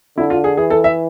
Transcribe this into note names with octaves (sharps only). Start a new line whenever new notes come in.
D3 E4
F4
G#4
E3 G#4
A4
E5